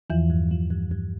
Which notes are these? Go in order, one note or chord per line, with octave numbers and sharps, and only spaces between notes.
E2 E3 F3
G2
F3
G2
G2